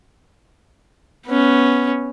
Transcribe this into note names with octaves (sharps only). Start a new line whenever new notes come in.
B3 C#4